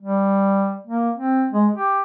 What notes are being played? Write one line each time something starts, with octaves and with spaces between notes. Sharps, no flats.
G3
A#3
C4
G#3
G4